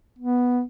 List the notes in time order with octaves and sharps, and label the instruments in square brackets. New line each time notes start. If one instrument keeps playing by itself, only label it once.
[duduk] B3